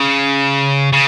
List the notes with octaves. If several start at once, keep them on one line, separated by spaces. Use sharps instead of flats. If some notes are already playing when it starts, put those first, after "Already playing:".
Already playing: C#3
C#3